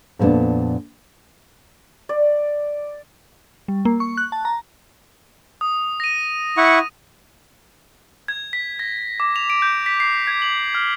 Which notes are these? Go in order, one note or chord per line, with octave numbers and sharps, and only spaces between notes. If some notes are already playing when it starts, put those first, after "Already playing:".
F2 A#2 A3 B3 D4
D5
G3
A#3
C#6
F#6
A5
A#5
D#6
A#6 D#7
E4 F#5 C#6
G#6
B6
A#6
D6
F7
D7
G6
B6
C7
G#6
F#7
F6